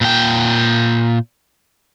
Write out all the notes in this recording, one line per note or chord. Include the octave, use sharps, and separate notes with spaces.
A#2 G5